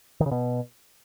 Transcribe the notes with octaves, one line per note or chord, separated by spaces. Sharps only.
D#3
C#3
B2